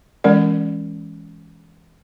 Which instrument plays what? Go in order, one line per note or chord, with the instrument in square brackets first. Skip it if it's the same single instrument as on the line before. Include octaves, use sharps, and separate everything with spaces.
[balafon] E3 G#3 C#4 A#4 D5